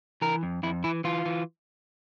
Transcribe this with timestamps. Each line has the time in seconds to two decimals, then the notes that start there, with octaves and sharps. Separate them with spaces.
0.22 E3 A#4
0.43 F2
0.63 F2 E4
0.84 E3 E4
1.04 E3 F4
1.26 E3